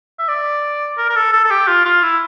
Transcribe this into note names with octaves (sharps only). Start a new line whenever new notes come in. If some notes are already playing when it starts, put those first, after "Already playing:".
E5
D5
A#4
A#4
A4
A4
A4
G4
F4
F4
E4